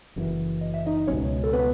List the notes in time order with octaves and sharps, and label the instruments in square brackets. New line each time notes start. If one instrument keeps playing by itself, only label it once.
[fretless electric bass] F#1 F#2 C#3 E3
[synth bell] D#5
E5
D#4 D#5
[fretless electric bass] C#2 B2 F#3 [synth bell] C#4 C#5
[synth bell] A4
B3 B4